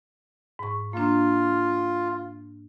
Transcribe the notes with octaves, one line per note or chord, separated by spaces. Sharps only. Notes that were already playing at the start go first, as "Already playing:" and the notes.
G#2 C#6
A#3 D4 F4